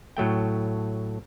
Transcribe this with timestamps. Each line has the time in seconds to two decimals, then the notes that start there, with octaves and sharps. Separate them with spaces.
0.17 A2 F#3 A3 G5